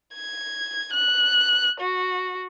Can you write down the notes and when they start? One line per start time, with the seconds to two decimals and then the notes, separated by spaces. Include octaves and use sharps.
0.15 G#6
0.93 F#6
1.80 F#4